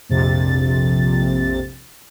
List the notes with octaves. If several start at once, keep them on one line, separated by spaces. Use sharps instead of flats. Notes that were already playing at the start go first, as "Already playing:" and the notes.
A#1 F2 C3 A6